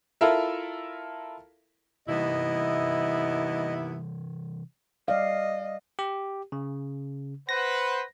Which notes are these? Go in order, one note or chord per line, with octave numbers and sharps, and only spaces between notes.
E4 F4 A4 A#4 E5
D#2 C3 E3 G3 B3 E4 D#5
G3 D5 D#5 F5
G4
C#3
B4 C5 F#5 A#6